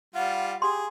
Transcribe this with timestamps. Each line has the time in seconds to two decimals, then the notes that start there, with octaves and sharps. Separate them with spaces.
0.15 G3 F4 F#5
0.62 G4 G#4 C6